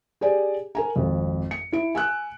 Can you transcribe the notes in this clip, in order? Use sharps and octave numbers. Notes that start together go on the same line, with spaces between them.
G4 G#4 D5 G#5
A#4 G#5 A#5
G#1 F2
C#7
E4 D7
G#5 E6 F#6